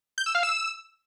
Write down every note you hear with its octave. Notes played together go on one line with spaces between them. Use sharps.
G6
E6
F5
E6